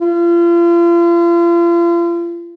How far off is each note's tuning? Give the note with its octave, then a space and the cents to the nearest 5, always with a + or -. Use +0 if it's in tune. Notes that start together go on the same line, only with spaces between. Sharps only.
F4 -40